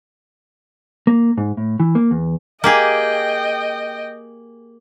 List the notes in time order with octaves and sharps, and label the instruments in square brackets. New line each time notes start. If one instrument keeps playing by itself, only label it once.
[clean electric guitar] A#3
G#2
A2
E3
A#3
E2
[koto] A#3 G4 G#4 [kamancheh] D#5 G5